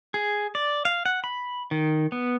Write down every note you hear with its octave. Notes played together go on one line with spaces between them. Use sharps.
G#4
D5
F5
F#5
B5
D#3
B3